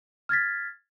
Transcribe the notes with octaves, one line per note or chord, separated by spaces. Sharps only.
F6 G#6 A6 B6